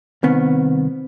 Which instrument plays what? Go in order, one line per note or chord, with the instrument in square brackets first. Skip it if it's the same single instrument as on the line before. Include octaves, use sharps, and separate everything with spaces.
[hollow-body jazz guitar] C2 D#3 B3 [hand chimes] C4